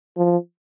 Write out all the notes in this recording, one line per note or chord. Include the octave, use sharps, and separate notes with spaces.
F3